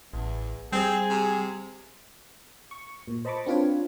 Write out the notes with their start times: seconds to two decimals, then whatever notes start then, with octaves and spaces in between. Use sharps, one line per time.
0.13 A1 E2
0.72 G3 C4 G#4
1.09 C3
2.71 C#6
3.07 A#2
3.25 C5 D#5 A5 B5 C#6 D6
3.46 C4 D4 F4 B4 C#5